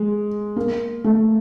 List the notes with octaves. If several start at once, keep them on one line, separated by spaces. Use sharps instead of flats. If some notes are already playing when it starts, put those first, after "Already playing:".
Already playing: G#3
A#3
A3